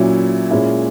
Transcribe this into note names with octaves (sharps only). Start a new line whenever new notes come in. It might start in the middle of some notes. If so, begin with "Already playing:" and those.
Already playing: A#2 F#3 C#4 E4
A#2 G#3 C#4 E4